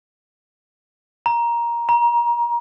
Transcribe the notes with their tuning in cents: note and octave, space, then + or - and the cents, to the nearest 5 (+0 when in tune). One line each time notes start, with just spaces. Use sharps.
A#5 +15
A#5 +30